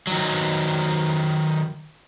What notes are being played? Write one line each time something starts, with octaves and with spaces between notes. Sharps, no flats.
D#3 F#3